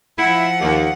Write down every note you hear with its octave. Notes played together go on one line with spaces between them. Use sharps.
F3 E4 F#5
D#2